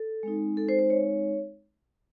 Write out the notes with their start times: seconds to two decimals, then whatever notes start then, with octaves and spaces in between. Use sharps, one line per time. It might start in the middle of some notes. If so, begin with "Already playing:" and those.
Already playing: A4
0.23 G#3 C4 D#4
0.57 A4
0.69 C5
0.79 C5
0.90 C#5